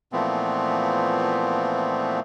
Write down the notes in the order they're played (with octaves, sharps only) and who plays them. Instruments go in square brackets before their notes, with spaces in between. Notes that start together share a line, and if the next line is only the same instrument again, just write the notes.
[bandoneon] A#2 E3 F3 A3 B3 C4